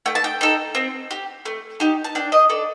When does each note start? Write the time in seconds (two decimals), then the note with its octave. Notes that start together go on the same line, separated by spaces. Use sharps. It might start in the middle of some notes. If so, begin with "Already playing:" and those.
0.06 A3 G5
0.15 A5
0.24 G5
0.41 D#4 A4
0.75 C4
1.11 G4
1.46 A3
1.80 D#4 G4
2.04 A5
2.15 D4 G5
2.32 D#5
2.49 A4 D5